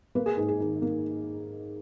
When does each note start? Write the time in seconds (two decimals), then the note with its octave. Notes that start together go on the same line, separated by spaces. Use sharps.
0.15 A#3 B4
0.26 G#4
0.37 G#2 G#4
0.48 G#4
0.60 D#3
0.82 A#3